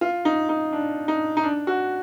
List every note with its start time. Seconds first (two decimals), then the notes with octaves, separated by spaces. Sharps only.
0.01 F4
0.25 D#4
0.49 D#4
0.73 D4
1.08 D#4
1.37 D#4
1.43 D4
1.67 F#4